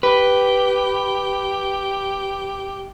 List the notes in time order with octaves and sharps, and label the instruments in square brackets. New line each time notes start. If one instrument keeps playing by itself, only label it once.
[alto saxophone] G4 [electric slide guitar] B4